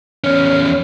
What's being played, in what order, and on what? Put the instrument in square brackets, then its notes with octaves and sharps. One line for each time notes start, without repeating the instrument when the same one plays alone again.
[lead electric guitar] E2 C#4